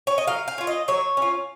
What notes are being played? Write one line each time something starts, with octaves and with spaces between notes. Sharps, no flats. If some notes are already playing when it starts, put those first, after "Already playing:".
C#5
D#5
F#3 F5
F5
C#4 F4
D#5
F#3 C#5
C#4 F4